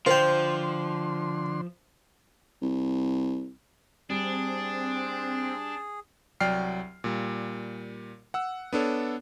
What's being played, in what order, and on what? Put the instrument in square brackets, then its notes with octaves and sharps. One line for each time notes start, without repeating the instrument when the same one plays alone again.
[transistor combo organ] D3 C6 [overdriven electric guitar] F3 [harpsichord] F4 G5 [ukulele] C5
[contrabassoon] C2
[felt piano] G3 [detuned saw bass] C4 [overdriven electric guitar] D4 [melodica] G#4
[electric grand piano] C2 F#3 D5 G5 F6 C7
A#2 G3
F#5 E6
B3 D4 A4 C#5